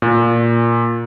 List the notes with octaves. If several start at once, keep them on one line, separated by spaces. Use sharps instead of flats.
A#2